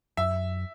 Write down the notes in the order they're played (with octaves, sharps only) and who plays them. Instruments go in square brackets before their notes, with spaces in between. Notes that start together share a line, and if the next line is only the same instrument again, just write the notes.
[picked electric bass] F#2 [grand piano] E5